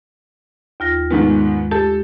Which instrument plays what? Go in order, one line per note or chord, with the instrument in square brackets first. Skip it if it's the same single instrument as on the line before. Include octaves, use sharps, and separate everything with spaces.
[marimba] D#2 F4 A#6
[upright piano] G#2 D#3 B3 [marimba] G#3
[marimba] G4 [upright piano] A4